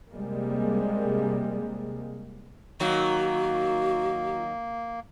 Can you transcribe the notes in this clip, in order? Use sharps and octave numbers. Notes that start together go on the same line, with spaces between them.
C3 G3 G#3 A#3
D#3 F#3 A#3 F#4